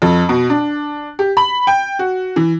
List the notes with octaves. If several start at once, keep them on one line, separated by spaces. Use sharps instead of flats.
F2
B2
D4
G4
B5
G5
F#4
E3